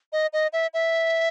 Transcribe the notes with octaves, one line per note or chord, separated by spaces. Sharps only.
D#5
D#5
E5
E5